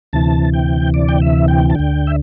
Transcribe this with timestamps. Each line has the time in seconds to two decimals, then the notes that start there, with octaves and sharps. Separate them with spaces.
0.13 D2 C3 E3 A5
0.53 G5
0.94 D5
1.09 G5
1.22 E5
1.48 G5
1.70 A5
1.75 D2 D3 G5
2.07 E5